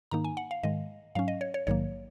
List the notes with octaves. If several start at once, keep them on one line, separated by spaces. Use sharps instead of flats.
G#2 D#3 A#3 D#4 A#5
G#5
F#5
F5
G#2 D#3 G#3 D#5
G#2 F#3 C#4 F5
D#5
C#5
C#5
A#1 G#2 D#3 F#3 A#3 C#5